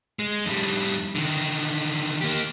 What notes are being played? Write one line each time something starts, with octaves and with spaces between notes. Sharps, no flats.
G#3
F2 G3
D3 D#3
A#3 G4